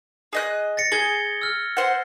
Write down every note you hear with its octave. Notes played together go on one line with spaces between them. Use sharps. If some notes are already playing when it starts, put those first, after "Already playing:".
G#4 D#5 F#6
A6 A#6 C#7
G#4 G#6 G7
E6 F6
C5 F#5